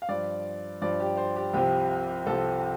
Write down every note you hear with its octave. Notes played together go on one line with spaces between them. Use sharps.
F5
G2 F3 D5
G2 F3 D5
G4
C5
G4
C2 C3 F3 G4
C2 C3 F3 A4